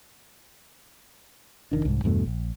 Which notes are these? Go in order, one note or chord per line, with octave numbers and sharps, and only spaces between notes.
F1 D#3 D4
C2 G#2
E2 G2 B2 A3
A#1